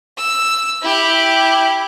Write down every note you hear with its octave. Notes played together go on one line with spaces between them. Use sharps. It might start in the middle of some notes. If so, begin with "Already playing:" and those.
E6
E4 G4